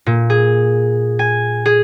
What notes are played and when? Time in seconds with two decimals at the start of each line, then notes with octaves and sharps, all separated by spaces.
0.06 A#2
0.30 G#4
1.19 G#5
1.66 G#4